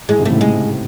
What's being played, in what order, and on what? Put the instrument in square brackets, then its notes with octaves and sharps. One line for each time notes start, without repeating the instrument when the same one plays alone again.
[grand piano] A2 [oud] G#3
[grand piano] G#2 C3
[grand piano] A2 C#3 [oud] A3
[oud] G#3